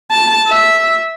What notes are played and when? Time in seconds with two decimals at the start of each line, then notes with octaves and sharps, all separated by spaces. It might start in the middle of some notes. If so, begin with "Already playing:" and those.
0.11 A5
0.48 E5